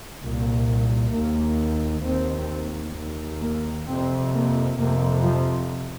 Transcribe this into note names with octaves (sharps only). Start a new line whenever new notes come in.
C2 A#2
D#2 A#3
D#2 C4
D#2
A#3
F2 C3 C4
A#3
F2 C3 A#3
F3